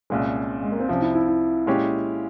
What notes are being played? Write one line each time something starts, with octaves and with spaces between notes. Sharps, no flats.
C2 A#2 G#3 C#4
G#3
A#3
C4
C2 C3 F3 C#4
E4
E4
E4
A#2 G#3 C#4 G4